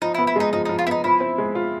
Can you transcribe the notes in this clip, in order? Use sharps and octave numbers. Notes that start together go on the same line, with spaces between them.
F3 D#4
E4
B3
E4
G#3 D#4
F3 D#4
F3 D#4
F4
B3 D#4 E4
F3 E4
C4
G#3
F4